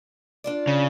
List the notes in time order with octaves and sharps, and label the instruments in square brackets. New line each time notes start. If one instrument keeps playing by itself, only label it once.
[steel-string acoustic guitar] D4 F4 D5
[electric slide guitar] C#3